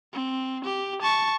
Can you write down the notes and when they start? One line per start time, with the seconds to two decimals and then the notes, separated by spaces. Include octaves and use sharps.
0.13 C4
0.65 G4
1.02 A5 C#6